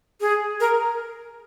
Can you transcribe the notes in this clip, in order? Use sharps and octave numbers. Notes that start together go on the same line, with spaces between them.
G#4
A#4